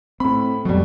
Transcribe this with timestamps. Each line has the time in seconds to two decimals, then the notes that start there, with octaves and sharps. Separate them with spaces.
0.20 A2 C4 B5
0.65 F2 B2 F#3 G3